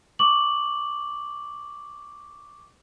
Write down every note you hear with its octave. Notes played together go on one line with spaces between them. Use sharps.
C#6 D6 F#7